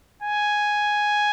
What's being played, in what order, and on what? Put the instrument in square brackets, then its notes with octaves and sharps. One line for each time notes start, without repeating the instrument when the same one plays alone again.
[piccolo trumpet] G#5